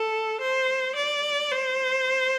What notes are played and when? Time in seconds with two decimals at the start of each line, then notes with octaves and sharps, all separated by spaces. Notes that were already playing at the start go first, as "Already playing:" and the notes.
Already playing: A4
0.41 C5
0.96 D5
1.51 C5